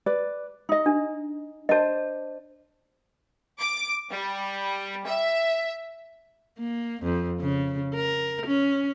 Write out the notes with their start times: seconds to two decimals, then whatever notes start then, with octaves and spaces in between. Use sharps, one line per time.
0.06 B4 D5
0.69 D#4 D#5
0.86 D4
1.69 D4 C5 D#5 A5
3.60 D6
4.11 G3
5.06 E5
6.59 A#3
7.03 F2
7.40 C#3
7.95 A#4
8.47 C#4